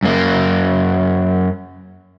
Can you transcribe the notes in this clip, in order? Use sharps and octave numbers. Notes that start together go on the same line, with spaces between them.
F#2 A#3